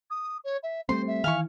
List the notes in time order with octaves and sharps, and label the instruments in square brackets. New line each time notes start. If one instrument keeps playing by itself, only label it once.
[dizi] D#6
C#5
E5
[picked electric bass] G3 A3 C4 [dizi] C5 [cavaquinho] C6
[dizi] E5
[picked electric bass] D#3 E3 [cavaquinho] F5 G#5 C#6